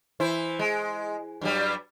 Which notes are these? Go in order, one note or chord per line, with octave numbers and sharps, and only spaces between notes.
E3 E4 C5
G#3
G2 F#3 G3